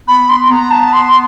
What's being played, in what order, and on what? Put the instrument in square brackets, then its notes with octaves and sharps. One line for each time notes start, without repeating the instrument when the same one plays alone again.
[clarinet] B3 [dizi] B5
[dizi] C6
[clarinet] B3 [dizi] A#5
[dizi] A5
C6